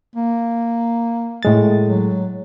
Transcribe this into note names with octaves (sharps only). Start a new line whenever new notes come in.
A#3
A2 G#3 A6
F#3